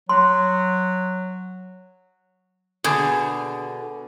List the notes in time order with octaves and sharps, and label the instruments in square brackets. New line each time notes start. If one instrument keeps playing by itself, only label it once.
[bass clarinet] F#3 [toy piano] C6
[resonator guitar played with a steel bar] B2 D3 [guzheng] G#4